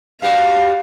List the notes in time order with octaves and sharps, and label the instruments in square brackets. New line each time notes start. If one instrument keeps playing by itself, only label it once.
[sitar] G2 G3 F#4 [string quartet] F5